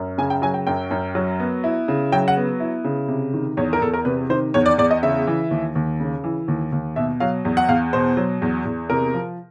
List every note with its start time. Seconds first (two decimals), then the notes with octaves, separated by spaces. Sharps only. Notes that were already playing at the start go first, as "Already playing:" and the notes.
Already playing: F#2
0.18 C#3 G#5
0.30 G5
0.42 F#3 G#5
0.54 G5
0.67 F#2 G5
0.91 F#2
1.15 F#3
1.40 B3
1.64 E4
1.88 C#3
2.12 F#3 G5
2.28 F#5
2.37 B3
2.60 E4
2.84 C#3
3.08 C3
3.34 D#3
3.57 E2 C#5
3.73 A#4
3.81 E2 A4
3.94 A#4
4.05 C3 B4
4.30 D#3 C5
4.54 E2 C#5
4.66 D5
4.78 E2 D5
4.91 D#5
5.03 C#3 E5
5.27 E3
5.51 D#2
5.75 D#2
6.00 C#3
6.24 E3
6.48 D#2
6.72 D#2
6.96 B2 E5
7.20 F#3 F5
7.45 E2
7.57 F#5
7.68 E2 F5
7.93 B2 C5
8.17 F#3
8.42 E2
8.65 E2
8.90 C3 A#4
9.14 F3